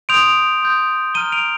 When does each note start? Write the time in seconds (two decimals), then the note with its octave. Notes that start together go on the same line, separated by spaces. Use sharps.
0.09 C6 D#6 G6 D7 F7
0.62 C6 D#6 G6
1.14 A#5 F6 D#7 G7
1.32 D7 F7